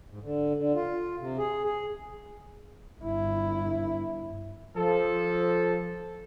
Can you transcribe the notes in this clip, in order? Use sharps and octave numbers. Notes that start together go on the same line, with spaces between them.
G#2
D3
D3
F4
C3
G#4
G#4
G1 E4
F3 A4